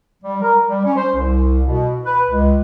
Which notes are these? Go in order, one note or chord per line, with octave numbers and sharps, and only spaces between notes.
G3
A#4
G3
C#4
C5
C2
B2
B4
C#2